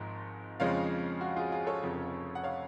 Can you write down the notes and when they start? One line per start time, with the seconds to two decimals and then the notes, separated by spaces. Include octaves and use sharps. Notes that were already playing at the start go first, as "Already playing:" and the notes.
Already playing: G#1 G#2 F3 G#3
0.60 F2 C#3 F3 G#3 C#5 F5
1.21 F#4
1.36 F4 G#4
1.52 F4 G#4
1.67 A4 C#5
1.83 F1 F2 C#3 F3
2.35 F#5
2.44 C#5 F5